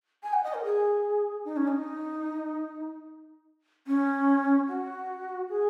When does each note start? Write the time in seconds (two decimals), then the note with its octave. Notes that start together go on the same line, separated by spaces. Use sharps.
0.23 G#5
0.33 F#5
0.44 D#5
0.54 A#4
0.64 G#4
1.45 D#4
1.56 C#4
1.68 D#4
3.87 C#4
4.68 F#4
5.49 G#4